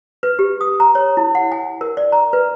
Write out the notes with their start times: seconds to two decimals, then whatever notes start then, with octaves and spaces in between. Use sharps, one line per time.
0.23 B4
0.39 G4
0.61 D#6
0.80 A#5
0.95 C#5
1.17 E4
1.35 F#5
1.52 G#5
1.81 A#4
1.97 D5
2.12 A#5
2.33 B4